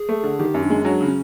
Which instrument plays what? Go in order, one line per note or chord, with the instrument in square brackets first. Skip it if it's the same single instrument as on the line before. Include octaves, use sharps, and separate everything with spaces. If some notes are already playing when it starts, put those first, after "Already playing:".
Already playing: [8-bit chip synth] G#4
[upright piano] A3
D3
[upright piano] D#3 [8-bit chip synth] G4
[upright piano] F#2
[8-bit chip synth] D4
[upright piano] G#3
[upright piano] F#3 [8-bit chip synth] D4
[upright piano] C#3
[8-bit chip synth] C#4